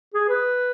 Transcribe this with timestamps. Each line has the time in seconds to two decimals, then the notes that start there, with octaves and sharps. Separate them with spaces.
0.14 G#4
0.29 B4